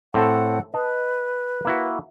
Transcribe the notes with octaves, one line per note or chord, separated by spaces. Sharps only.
A2 C4 A4 F#5
B4 D#5 A5
A#3 E4 F#4